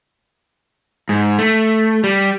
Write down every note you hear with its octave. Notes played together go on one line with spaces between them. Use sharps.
G#2
A3
G3